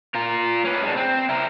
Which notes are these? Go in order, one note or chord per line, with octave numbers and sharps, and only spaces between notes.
F4 A#4
C#4 B4
G#3 D4
C4
E4 A#4